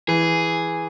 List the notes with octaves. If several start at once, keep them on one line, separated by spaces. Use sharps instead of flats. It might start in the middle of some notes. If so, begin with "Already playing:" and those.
E3 G#4